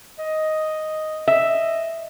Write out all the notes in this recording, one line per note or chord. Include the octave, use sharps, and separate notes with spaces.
D#5
D#5 E5